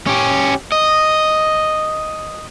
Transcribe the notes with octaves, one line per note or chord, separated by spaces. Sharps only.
C#4 G4
D#5